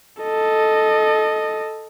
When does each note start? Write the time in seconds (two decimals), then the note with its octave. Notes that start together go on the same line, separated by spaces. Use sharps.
0.22 A4 D#5